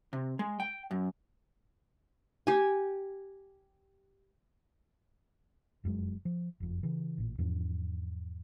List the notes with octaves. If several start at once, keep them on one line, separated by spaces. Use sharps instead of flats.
C3
G#3
G5
F#2
G4 G#5
F1 F#2 C3 G#3
F3
F#1 F2
C#3 E3
A1 A#2
E2 G#2 F3 D4